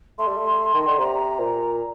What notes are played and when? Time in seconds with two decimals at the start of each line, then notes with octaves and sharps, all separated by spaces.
0.18 A3 C6
0.27 G3
0.37 A3
0.74 D#3
0.86 D3
0.99 C3 A#5
1.39 A#2